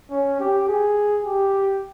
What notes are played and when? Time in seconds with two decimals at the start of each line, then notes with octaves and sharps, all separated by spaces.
0.11 C#4
0.40 G4
0.68 G#4
1.25 G4